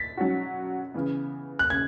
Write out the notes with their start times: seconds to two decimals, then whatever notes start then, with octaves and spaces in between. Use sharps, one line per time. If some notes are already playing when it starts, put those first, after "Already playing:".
Already playing: A6 B6
0.17 F#3 C#4 F#4
0.94 C#3 E3 B3
1.59 F#6
1.70 C#3 G#6